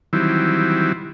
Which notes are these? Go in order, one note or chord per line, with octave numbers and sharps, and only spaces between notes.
D#3 E3 F#3 G3 C4 E4